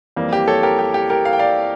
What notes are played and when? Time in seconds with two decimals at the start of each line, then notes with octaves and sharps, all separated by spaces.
0.16 F2 E3 G3 A#3
0.33 G4
0.48 A4 C#5
0.63 G4 A#4
0.79 G4
0.94 G4
1.10 G4 A#4
1.25 F5
1.33 G5
1.39 D5 F5